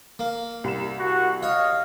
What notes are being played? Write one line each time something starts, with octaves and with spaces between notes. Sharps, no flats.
A#3
C2 E7
F#4
C#5 D#5 F5